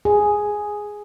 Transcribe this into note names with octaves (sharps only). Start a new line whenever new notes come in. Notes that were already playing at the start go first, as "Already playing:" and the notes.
G#4